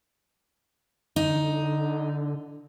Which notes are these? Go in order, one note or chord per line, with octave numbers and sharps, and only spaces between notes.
D3 D#4